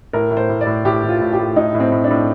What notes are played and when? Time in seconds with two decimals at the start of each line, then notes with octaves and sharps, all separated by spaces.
0.13 A2 A#4
0.31 A2
0.37 C5
0.49 A2
0.61 D5
0.66 A2
0.85 A2 G4
1.03 A2
1.09 F4
1.21 A2
1.33 G4
1.39 A2
1.56 A2 D#4
1.74 A2
1.80 C4
1.92 A2
2.04 D4
2.11 A2